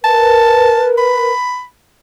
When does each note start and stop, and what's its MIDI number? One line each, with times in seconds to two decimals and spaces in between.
0.04 1.31 70
0.04 1.31 71
0.04 0.86 81
0.98 1.64 83